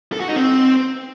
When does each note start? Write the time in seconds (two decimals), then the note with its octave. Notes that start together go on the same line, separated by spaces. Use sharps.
0.13 A4
0.20 F#4
0.28 D#4
0.36 C4